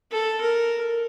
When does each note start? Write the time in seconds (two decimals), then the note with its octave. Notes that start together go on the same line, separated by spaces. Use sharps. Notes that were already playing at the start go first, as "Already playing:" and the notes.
0.11 A4
0.41 A#4